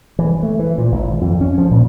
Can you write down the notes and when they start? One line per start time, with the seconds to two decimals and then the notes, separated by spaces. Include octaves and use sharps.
0.19 E3
0.43 A3
0.59 E3
0.78 A#2
0.92 G#1
1.21 F2
1.41 C#4
1.58 F3
1.71 A#2